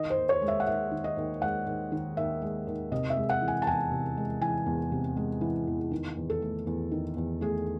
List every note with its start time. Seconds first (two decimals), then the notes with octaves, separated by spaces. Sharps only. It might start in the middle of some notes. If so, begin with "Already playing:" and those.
Already playing: D#3 D#5
0.10 C5
0.17 D#2
0.29 C#5
0.42 G#3
0.48 E5
0.60 F#5
0.67 D#2 E5
0.91 D#3
1.04 D#5
1.17 D#2
1.41 G#3 F#5
1.66 D#2
1.92 D#3
2.17 D#2 E5
2.42 G#3
2.67 D#2
2.92 C3 D#5
3.10 E5
3.17 G#3
3.30 F#5
3.42 E3
3.48 G#5
3.62 A5
3.67 E2 G#5
3.91 C3
4.17 G#3
4.41 E3 G#5
4.66 E2
4.92 C3
5.17 G#3
5.41 E3
5.67 E2
5.91 D#3
6.17 E2
6.30 A4
6.42 A3
6.67 E2
6.92 D#3
7.17 E2
7.41 A3 G#4